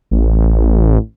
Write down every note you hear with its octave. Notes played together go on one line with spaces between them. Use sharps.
A1